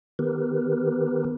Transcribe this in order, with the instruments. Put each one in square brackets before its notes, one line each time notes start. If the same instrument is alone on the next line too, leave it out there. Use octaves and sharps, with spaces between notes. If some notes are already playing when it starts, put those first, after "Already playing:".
[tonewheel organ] D#3 B3 G4 A#4 B4